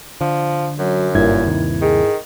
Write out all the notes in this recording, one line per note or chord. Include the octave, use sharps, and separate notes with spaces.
D3 F3
F#2 F#3
F#1 G2 A#2 E4 G#6
D#2 C3 D#3
D#3 G#4